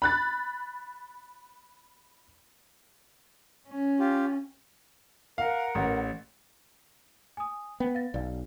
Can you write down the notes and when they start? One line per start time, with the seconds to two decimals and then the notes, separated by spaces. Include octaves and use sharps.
0.02 B5 F#6 A6
3.67 C#4
3.99 F4 G4
5.38 A#4 F5 F#5
5.75 A1
7.37 G#5 D#6
7.80 B3 G5
7.95 F5 A6
8.14 B1 D5 F5